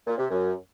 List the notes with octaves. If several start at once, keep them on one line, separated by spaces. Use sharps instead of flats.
A#2
C3
F#2